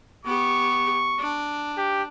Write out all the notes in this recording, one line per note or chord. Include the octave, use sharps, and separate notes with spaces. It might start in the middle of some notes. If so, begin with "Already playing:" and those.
B3 G4 C#6
D4
G4